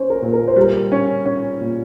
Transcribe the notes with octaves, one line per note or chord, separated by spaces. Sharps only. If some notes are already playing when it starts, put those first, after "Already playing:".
Already playing: C#4 C5
A#4
A#2
A#4
C5
G3 A#4
C#4
C#4
A#2